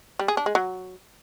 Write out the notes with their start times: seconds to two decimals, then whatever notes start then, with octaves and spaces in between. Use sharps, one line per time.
0.19 G3
0.28 G#4
0.37 D4
0.46 G#3
0.55 F#3